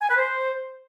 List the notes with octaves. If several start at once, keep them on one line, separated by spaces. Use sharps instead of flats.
G#5
B4
C5